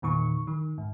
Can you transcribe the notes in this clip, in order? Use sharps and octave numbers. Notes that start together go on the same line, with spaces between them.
E2 A#2 D#3 C#6
D#3
G#2